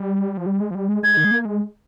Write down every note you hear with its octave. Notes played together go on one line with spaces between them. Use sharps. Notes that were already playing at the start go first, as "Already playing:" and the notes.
Already playing: G3
F3
G3
G#3
F3
G3
G#3
G#3 G#6
D#3
G#3
A#3
G#3